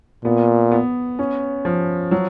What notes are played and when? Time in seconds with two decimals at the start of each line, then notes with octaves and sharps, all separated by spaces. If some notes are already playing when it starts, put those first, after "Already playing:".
0.25 A#2 B3
0.72 B3
1.19 C#4
1.65 F3
2.11 F#3